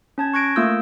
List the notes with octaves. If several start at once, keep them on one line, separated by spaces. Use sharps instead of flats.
C#4 A5 G#6
C#6 F#6 G#6 A#6 D7
A3 A#3 F4 D#6 E6 G6